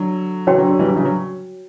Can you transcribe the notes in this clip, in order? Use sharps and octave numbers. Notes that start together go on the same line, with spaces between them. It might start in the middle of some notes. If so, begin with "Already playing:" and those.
Already playing: D3 F#3
C#3 E3 F#4 C#5 G5
D3 F#3
D3 F#3
E3 G3
D3 F#3
C#3 E3
D3 F#3